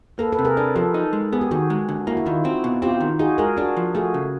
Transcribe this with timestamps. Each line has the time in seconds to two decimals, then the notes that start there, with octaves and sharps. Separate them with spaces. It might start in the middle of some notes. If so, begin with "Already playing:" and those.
0.19 A#3 A4 B4
0.33 A4 B4
0.39 C3
0.45 G#4 A#4
0.57 D4 A4 B4
0.75 F3 G4 A4
0.94 D#4
1.13 G#3
1.32 B3 G#4
1.41 G4
1.51 D#3 F#4 G#4
1.70 G#3
1.89 D3
2.07 A#3 E4 F#4
2.17 E4
2.26 D#3 D#4 F4
2.44 C4 E4 F#4
2.64 B2
2.82 C4 F4 G4
3.00 D#3
3.19 D#4 F#4 G#4
3.38 G#3 G#4 A#4
3.57 D4 F#4 G#4
3.77 F3
3.95 A3 F#4 G#4
4.14 C#3